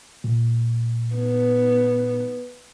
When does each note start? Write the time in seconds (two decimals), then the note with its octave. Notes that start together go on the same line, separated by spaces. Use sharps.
0.24 A#2
1.15 B3